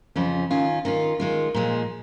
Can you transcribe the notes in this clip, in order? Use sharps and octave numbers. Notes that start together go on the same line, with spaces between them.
F2 C#3 F3 C#4
D#3 C#4 F4
D#3 C#4 F4
D#3 G#3 F4
A#2 F3 G#3